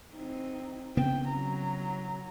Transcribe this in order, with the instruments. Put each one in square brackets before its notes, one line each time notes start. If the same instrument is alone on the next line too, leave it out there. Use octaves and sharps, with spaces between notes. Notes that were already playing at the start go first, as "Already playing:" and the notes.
[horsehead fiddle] C4 D#4
[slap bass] C#3 B3 C4 [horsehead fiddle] G5
[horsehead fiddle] F#3 A#5